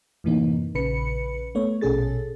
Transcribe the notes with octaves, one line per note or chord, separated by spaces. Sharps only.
F#2 A2 C3 E3 A#3 D#4
A#1 C#3 B4 B5 C#7
A3 B3 C#5
A#1 B2 C#4 G#4 A4 A6